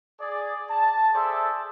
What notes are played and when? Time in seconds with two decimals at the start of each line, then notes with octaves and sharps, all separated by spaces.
0.20 G#4 D5
0.69 A5
1.14 G#4 A4 C5 D5 E5 A5